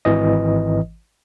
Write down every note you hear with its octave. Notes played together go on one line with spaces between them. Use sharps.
G#1 E3 D#5